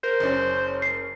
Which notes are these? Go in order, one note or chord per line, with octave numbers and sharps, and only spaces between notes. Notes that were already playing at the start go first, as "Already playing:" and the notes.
A#4 C5
F#1 C#4
C7